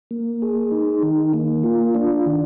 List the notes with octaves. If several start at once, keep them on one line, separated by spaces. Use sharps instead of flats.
A#3
G#4
D#4
D#3
A#3
F4
D4
D#3